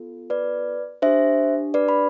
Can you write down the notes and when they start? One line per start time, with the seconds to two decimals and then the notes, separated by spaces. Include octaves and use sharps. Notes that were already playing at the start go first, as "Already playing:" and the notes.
Already playing: B3 F4 A4
0.30 B4 D5
1.02 D4 G4 C5 E5
1.74 B4 D5
1.89 B5